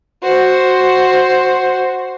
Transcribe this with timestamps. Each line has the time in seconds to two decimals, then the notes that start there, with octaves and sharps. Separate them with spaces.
0.23 F#4 C5